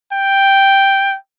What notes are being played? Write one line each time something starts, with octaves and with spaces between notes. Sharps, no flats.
G5